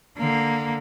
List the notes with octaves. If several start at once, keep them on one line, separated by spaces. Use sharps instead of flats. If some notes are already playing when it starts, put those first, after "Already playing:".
D3 A#3